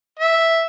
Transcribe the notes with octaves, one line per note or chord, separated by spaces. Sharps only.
E5